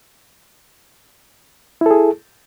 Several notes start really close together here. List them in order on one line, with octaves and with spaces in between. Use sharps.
E4 A4 G#4